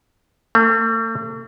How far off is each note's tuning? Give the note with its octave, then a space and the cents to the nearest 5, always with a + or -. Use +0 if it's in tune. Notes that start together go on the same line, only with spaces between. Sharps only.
A3 +45